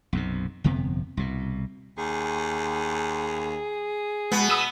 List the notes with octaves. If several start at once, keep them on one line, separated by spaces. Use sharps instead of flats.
B1 F#2 C3
G1 F2 C3 B3
C2 B2
D#2 G#4
B2 G#3 B3
B5 D#6 E6